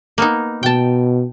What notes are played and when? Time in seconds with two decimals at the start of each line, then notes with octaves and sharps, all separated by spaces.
0.18 A#3 B3 D#4
0.63 B2 G5 A5